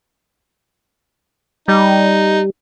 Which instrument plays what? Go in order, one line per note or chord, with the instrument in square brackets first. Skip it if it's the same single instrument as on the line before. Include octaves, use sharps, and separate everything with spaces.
[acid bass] G3 [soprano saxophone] D#4